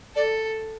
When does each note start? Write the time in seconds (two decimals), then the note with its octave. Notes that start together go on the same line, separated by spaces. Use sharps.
0.16 A4 D5